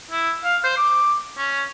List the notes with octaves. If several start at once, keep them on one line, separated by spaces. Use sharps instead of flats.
E4
F5
C5
D6
C#4